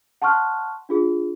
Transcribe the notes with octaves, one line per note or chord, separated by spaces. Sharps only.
F#5 A5 C6 C#6 F6 F#6
D4 F4 G#4